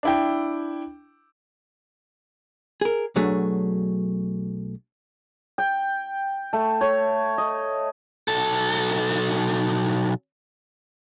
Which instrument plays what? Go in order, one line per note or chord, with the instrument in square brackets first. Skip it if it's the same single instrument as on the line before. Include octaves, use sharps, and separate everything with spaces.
[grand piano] D4 E4 G5
[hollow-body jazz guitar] G#4 A#4
B1 F#3 A3 D4 G#4
[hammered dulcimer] G5
A3
C#5
D#5
[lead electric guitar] B1 A4